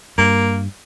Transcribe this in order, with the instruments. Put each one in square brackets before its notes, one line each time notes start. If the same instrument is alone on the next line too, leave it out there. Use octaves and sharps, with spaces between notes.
[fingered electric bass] G2 [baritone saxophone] A#3